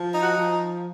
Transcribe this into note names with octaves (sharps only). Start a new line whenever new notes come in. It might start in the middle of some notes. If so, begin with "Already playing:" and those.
Already playing: F3
D#4
F#4
F3